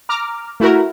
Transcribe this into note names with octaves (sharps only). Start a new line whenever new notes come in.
A#5 D6 F6
A3 E4 F#4 A#4